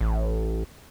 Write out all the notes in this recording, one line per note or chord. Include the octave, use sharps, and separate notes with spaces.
A1